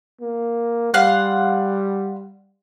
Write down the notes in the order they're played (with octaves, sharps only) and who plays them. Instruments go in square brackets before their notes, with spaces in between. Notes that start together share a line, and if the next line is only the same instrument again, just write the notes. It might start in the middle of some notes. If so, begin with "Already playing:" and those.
[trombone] A#3
[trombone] G3 [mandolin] F5 F#5 C6